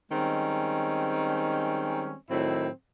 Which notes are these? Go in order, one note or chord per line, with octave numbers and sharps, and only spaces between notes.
D#3 G3 G#3 C4 C#4
A2 D#3 F#3 C4 E4